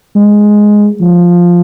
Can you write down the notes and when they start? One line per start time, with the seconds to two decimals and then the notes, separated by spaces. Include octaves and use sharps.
0.16 G#3
1.00 F3